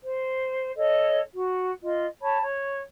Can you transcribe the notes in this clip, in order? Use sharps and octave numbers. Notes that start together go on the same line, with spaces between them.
C5
A4 C#5 D#5
F#4
F4 D#5
C#5 A5 B5
C#5